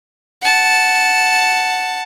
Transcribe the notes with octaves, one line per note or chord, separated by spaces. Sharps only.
F#5 A5